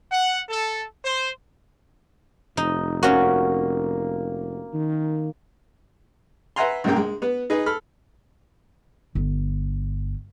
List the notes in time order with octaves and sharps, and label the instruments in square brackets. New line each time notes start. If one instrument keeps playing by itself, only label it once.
[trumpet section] F#5
A4
C5
[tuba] F1 [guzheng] D#4
[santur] A#3 [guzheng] C#4 F#4
[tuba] D#3
[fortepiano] B4 E5 F#5 G#5 A#5 C6
A#1 G#2 C#3 A#3 G5
G#3
B3 B4
D#4 G#4 B4 D#5
A4 B5 F6
[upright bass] G1